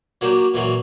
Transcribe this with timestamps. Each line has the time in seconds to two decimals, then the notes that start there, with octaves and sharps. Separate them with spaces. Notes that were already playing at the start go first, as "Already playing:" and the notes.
0.21 F#3 A#3 D4 G4
0.54 A#2 E3 F#3